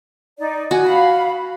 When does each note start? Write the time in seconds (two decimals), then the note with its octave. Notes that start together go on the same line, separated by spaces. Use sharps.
0.39 D#4 D5
0.71 F#4 G#5
0.85 F5 B5